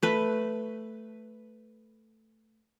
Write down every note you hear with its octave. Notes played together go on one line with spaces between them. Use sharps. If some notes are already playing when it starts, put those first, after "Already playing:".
A3 B4